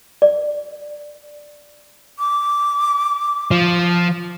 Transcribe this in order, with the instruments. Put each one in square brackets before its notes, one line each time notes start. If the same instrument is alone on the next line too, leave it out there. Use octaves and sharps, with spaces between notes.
[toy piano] D5
[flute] D6
[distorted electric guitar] F3